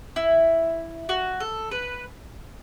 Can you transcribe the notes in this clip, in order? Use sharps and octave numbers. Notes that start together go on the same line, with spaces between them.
E4
F#4
A4
B4